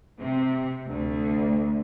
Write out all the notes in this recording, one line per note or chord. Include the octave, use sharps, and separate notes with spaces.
C3
D2